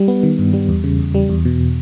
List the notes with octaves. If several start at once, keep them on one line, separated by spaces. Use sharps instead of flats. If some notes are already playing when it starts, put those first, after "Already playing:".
Already playing: G3
B3
D#3
G2
G3
E2
C#3
E2
G3
E2
B2